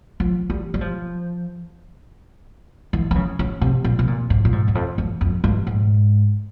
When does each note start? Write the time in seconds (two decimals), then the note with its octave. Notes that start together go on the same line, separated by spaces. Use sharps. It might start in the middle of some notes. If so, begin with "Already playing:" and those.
0.20 F3
0.50 G3
0.74 G3
0.81 F3
2.93 E3
3.11 E3
3.15 C#3
3.39 C#3
3.61 C3
3.84 A#2
3.99 C3
4.07 A#2
4.30 G#2
4.45 A#2
4.52 G#2
4.68 E2
4.75 F2
4.98 E2
5.21 F2
5.44 G2
5.67 G#2